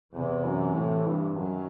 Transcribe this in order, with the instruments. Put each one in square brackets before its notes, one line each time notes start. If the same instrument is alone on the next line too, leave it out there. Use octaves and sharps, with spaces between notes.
[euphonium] E2 [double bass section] C3 E3
[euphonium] F#2
A2
G2
[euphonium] F#2 [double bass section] D#3 F#3